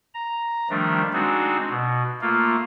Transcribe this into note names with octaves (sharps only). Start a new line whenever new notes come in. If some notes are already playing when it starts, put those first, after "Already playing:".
A#5
D#3 F3 G3 A3 D4
G#3 C4 D4 D#4 F#4
B2
A3 A#3 F4